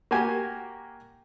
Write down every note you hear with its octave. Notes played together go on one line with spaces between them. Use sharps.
A#3 F#4 G4 G#5